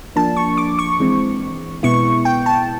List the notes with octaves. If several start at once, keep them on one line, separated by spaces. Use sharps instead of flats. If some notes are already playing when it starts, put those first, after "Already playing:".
F3 A#3 D4 A5
C#6
D6
C#6
E3 G#3 C4
B2 G#3 B3 E4 C#6
G5
A5